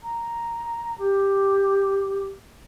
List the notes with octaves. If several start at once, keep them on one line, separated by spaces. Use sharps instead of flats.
A#5
G4